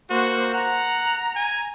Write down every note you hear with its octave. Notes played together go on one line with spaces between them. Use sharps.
A#3 F#4 C5
F#5 A#5
G#5